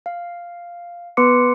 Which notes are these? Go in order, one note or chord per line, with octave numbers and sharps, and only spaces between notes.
F5
B3 B4 C6 D6 C#7